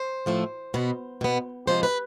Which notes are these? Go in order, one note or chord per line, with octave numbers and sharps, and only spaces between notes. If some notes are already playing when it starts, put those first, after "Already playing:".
Already playing: C5
A2 F3 A3
B2 B3
B2 B3
C3 F3 G#3 C5
B4